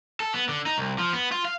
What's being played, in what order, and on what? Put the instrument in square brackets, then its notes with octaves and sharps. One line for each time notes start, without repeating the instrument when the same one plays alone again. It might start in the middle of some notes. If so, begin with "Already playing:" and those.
[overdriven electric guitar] A4
B3
D3
D#4
C2
F3
B3
F4
F5